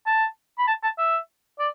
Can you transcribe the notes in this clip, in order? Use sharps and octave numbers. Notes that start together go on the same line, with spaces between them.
A5
B5
A5
A5
E5
D5